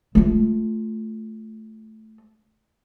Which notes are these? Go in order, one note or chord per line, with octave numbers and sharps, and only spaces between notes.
A3 F4